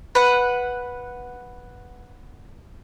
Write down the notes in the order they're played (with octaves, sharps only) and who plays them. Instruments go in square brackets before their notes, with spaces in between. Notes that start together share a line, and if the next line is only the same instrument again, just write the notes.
[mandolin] B4 F#5